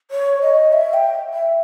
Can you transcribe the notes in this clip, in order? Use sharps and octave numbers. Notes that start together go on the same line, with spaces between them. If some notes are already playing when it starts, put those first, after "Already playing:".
C#5
D#5
E5
G5
E5